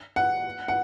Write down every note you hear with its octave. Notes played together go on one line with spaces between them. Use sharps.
F#5
F#5